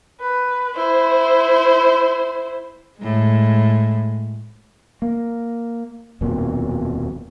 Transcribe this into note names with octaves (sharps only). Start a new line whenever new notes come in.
B4
E4 C5
A2 G#3
A#3
D#1 F2 B2 A#3